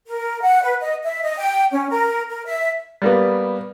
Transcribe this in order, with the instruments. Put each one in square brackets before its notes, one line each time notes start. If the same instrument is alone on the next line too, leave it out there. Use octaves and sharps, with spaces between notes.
[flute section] A#4
F#5
B4
D#5
E5
D#5
G5
C#4
A#4
A#4
E5
[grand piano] G3 A#3 B3